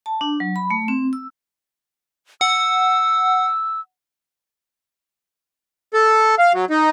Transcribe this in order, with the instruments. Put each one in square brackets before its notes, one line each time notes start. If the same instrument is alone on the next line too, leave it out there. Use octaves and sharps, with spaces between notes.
[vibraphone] A5
D4
F#3
B5
A3
C4
E6
[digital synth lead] F#5 [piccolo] E6
[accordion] A4
F5
F#3
D#4